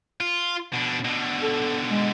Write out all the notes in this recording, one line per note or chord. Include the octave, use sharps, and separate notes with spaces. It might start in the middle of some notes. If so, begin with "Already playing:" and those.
F4
B2 D4
B2 D3
A4
G#3